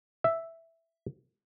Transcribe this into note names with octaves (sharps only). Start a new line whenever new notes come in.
E5